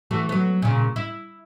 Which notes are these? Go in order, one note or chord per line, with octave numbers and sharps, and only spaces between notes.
E3 A3 F#4
F#3 B3
A#2 C#3
E4